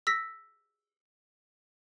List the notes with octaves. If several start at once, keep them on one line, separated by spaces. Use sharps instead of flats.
E6 A#6 B6